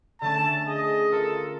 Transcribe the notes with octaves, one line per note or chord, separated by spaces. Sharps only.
D3 A3 C#4 A5
G#4 D#5
F4 A4 A#4